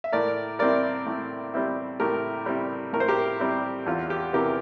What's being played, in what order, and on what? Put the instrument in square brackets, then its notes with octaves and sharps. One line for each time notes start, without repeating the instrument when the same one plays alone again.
[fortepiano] E5
A2 A#4 D5
G3 C4 E4 A#4 D5
A2
G3 C4 E4
A2 G4 A#4
G3 C4 E4
A2 A#4
C5
G4 A#4
G3 C4 E4
E2 F4
G4
C3 E3 G4 A#4